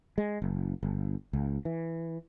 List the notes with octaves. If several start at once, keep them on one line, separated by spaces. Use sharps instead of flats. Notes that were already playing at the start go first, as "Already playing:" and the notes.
G#3
F#1
G1
C#2
E3